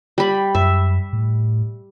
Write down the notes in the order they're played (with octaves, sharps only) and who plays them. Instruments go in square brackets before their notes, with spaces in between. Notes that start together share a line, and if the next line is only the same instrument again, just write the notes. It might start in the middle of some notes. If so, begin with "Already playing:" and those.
[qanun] G3 B5
[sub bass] F#2 [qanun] E5
[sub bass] A2